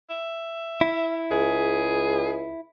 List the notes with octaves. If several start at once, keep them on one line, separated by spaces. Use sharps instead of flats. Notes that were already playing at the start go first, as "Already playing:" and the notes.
E5
E4
C#2 G#4